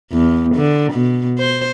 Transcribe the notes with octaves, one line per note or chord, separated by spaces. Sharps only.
E2
D3
B2
C5